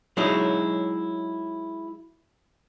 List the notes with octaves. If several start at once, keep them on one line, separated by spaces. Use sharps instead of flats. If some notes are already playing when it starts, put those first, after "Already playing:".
F#3 G#3 C#4 D#4 E4